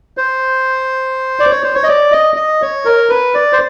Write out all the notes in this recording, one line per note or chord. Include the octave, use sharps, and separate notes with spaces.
C5
D5
C#5
C5
C#5
D#5
D5
D#5
D#5
C#5
A#4
B4
D5
C5